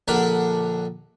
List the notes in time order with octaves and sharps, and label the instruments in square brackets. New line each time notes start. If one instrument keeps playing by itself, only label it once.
[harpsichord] A#1 D3 D4 A#4 F#5 B5